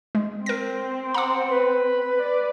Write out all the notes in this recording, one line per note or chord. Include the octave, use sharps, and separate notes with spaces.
G#3
C4 A#4 A#6
F#5 A#5 D6
B4
D5